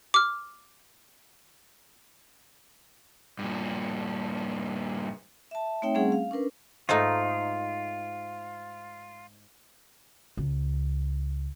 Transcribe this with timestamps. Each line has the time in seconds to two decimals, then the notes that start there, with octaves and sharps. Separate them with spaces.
0.14 D6 F6
3.39 G2 A#2
5.51 E5 A5
5.82 A3 C4 D#4 C#5 E5 G5
5.95 G3 A3 C4 C#4 G#4 F#5
6.12 F5
6.31 C#4 D4 A#4 B4
6.89 G#2 A3 D#4 F4
10.37 C#2